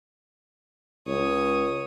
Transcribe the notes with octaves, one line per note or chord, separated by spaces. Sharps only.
C#2 C#5 D#6